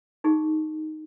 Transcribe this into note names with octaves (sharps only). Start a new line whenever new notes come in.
D#4 G4 G#4